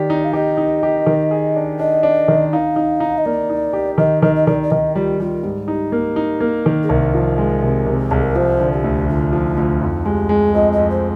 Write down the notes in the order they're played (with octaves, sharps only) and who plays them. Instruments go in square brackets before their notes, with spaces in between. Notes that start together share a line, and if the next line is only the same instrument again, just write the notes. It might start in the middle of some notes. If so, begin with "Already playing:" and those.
Already playing: [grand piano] D#3 G4 [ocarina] D5
[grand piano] D#4
[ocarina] F5
[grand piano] G4 [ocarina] D#5
[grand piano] D#4
G4
D#3
G#4
D4
[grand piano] D4 [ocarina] D#5
[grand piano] D4
D#3
[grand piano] D#4 [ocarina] F5
[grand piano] D#4
D#4
[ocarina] D#5
[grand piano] A#3 [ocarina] D5
[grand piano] D#4
G4
[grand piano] D#3 [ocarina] D#5
[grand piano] D#3 [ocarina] D#5
[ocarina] D#5
[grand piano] D#3 [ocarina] D5
[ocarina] D5
[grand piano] D#3 [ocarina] D#5
[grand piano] G3 [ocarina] F4
[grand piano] G3 [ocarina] F4
[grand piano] G#2 [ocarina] G4
[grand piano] D#4
A#3
D#4
A#3
D#3
[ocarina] G#4
[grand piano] C2 [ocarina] A#4
[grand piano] F3
G#3
C3
C3
[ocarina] G4
[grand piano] C2 [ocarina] G#4
[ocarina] A#4
[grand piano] F3 [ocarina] C5
[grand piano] D3
[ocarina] G4
[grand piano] D2
[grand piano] D3 [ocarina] F4
[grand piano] F3 [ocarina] D#4
[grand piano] D2 [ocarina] F4
[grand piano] F2 [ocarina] D#4
[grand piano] G#3 [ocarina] G4
[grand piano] G#3 [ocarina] G#4
[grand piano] F2 [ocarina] D#5
[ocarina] D#5
[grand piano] F2
[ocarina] C5